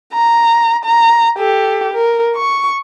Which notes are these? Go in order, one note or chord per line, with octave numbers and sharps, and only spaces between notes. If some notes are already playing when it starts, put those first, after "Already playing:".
A#5
A#5
G4 A4
A#4
C#6